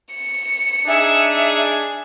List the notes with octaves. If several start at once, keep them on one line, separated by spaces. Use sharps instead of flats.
C#7
D4 D#4 G#4 E5